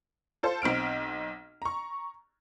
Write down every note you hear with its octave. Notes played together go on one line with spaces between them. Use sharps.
F4 A4 C5
B1 C4 F6 D7
A#5 C#6